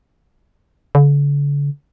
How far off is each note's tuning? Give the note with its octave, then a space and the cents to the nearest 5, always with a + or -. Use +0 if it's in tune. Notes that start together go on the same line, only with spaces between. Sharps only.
D3 -45